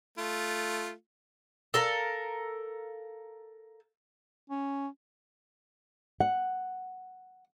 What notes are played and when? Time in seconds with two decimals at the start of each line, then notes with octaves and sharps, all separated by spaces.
0.18 A3 F4
1.74 A4 A#4 F5 A#5
4.50 C#4
6.20 F#5